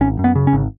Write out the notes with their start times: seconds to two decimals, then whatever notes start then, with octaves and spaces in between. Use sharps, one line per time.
0.01 G#1 C#4
0.19 F#2
0.24 B3
0.35 C#3
0.47 C#4
0.53 G#1